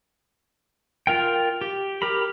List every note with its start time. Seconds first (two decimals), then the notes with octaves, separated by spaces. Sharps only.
1.07 F4 A#4 G5
1.61 G4
2.02 G4 A#4 B5